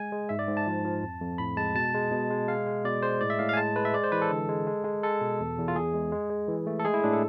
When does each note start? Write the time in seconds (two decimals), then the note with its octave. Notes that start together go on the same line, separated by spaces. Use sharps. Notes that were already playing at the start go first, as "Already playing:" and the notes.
Already playing: G#3 G#5
0.12 G#3
0.29 G#2 E5
0.39 D5
0.47 G#2
0.57 A5
0.67 F3
0.85 F3
1.02 F2
1.21 F2
1.38 A2 B5
1.57 G#3 A5
1.75 B2 A5
1.94 G#3
2.11 B2
2.30 G#3
2.48 G#3 F5
2.67 G#3
2.84 B2 D5
3.02 G#3 C5
3.21 A2 D5
3.30 E5
3.39 A2 F5
3.49 F5 G#5
3.57 G#3 A5
3.76 G#3 B4
3.85 E5
3.93 G#3 D5
4.04 C5
4.12 E3 B4
4.22 A4
4.31 D3
4.49 G#3
4.67 G#3
4.84 G#3
5.03 G#3 A4
5.21 B2
5.40 E2
5.58 E2
5.68 F4
5.76 E2 G#4
5.94 G#3
6.12 G#3
6.30 G#3
6.48 E3
6.67 A3
6.80 A4
6.85 G#3 G#4
6.94 E4
7.04 A2 D4
7.13 A4